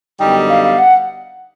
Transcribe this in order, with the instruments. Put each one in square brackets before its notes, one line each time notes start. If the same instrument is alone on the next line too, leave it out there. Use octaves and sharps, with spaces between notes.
[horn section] F#2 D3 G3 B3 D#4 [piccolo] G5
[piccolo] F5
F5
F#5